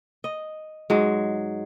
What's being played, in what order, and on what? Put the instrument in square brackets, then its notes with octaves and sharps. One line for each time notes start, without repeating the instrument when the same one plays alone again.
[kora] D#5
G#2 F#3 G#3